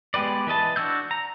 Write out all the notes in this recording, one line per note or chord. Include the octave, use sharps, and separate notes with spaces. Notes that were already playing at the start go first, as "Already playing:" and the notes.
G#3 B3 G4 B4 D5
E3 B4 D#5 A5
D4 F#4 E6 G6
A#5